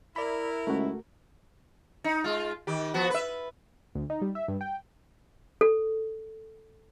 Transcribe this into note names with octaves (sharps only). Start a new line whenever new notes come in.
E4 A#4 D5 B5
C#2 A3 F#4
D#4
G#3 F4
D#3 G4
F3 B3 F#4
B4 E5
D2
D#4
G3
E5
G2
G5
A4